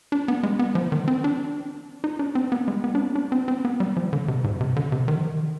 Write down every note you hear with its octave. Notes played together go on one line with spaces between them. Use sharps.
D4
B3
G#3
B3
F3
D#3
C4
D4
D#4
D4
C4
B3
G#3
B3
D4
C4
D4
C4
C4
B3
G3
F3
D3
C3
G#2
C3
D3
C3
D#3
F3
D#3